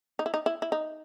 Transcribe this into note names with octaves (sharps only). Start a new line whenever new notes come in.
D#4
E4
D#4
E4
E4
D#4